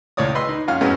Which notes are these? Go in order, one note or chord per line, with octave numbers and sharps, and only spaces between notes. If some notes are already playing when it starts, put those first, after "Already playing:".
C#2 A2 C#5 D5 D#6
B4 D#5 B5 C6 E6
D#4
F2 C#4 F4 F5 F#5 F6
F#2 A2 G#3 B3 C#4